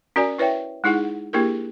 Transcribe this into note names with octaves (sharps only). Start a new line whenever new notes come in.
C#4 F#4 A#4 D5 G#5
E4 B4 C#5 E5 G5
G#3 D#4 E4 G#4 F#5
A#3 D4 E4 G4 G#4 A#4